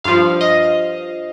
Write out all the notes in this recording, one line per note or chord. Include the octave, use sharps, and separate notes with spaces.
G2 F3 F5
D#5